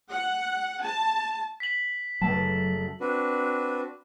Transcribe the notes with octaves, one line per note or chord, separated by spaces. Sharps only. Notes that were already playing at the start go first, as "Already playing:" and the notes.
F#5
A5
B6 F#7
F#1 F#3 A3 A5
C4 D4 F#4 B4